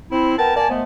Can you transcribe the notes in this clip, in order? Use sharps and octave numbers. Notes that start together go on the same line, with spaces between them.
C4 E4
B3 A#4 G5 A5
A#3 D5 G#5 A5
F3 G#3 A3 B3